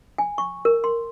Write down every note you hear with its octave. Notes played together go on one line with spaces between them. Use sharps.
G#5
C#6
A#4
C6